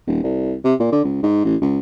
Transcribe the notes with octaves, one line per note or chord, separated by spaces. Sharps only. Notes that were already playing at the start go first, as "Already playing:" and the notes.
D#1
C2
C3
A#2
D3
C#2
G#2
A1
C#2